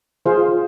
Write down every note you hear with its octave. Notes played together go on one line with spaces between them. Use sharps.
F4 G#4 C5 F5